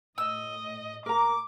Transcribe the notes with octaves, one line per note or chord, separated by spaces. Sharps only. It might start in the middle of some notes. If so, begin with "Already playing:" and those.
A2 D#5 E6
A#4 A#5 D6